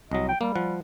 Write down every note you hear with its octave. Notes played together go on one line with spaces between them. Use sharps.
C2 F#3 D#5
G5
G3 A#3
F3 F#5